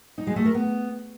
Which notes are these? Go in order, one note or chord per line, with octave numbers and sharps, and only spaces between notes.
D#4
G#3
A3
A#4
B3